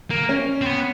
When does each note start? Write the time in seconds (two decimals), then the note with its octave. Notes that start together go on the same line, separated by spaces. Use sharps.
0.10 A#3
0.29 C#4
0.61 C4
0.66 B3